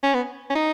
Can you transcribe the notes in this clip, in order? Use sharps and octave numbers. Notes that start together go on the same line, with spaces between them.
C#4
B3
C#4
D#4